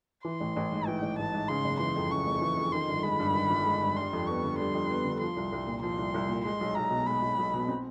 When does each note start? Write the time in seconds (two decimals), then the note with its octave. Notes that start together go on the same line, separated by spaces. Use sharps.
0.25 E3 C6
0.40 A1
0.56 A1
0.72 G#2
0.87 E3 G5
1.02 A1
1.19 A1 A5
1.33 G#2
1.49 C#3 C6
1.64 F#1
1.80 E3 C6
1.96 F2
2.11 C#3 C#6
2.27 F#1
2.41 E3
2.57 F2
2.73 D#3 C6
2.89 G1
3.03 G#3 B5
3.20 G2
3.34 D#3
3.50 G1
3.66 G#3
3.82 G2
3.97 G3 C6
4.13 F2
4.27 B3 C#6
4.43 D3
4.58 G3 C6
4.75 F2
4.90 B3
5.05 D3
5.20 F3 C6
5.37 C2
5.52 C2
5.67 A#2
5.83 F3 C6
5.98 C2
6.14 C2
6.29 A#2
6.45 G#3 C6
6.61 B1
6.75 B1 A#5
6.90 B2
7.06 G#3 B5
7.22 B1
7.38 B1
7.54 B2
7.68 C4